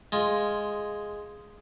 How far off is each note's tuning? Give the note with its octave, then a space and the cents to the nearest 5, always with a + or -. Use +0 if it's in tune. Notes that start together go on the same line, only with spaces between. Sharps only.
G#3 +0 F4 +0